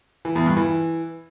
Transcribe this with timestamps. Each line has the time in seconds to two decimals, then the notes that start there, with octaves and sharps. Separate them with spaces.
0.25 E3
0.35 E2
0.46 G2
0.57 E3